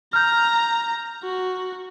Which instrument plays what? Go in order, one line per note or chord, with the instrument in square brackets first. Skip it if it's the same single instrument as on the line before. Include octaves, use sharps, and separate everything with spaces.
[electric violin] A#5 [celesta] F6 G6
[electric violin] F#4